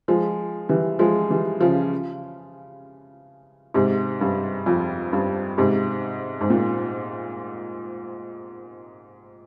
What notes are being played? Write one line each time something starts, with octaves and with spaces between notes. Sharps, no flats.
F3 G#3
E3 G3
F3 G#3
E3 G3
C#3 F3
G#2 C3
G2
F2
G2
G#2 C3
G#2
A#2